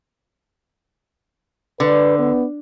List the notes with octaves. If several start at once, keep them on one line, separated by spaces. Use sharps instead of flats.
D3 B4
B3